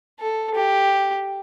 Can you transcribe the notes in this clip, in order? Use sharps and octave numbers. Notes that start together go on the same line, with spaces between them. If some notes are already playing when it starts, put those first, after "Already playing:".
A4
G4